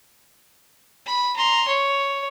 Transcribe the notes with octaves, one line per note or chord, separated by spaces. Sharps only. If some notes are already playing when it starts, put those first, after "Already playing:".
B5
A#5 C6
C#5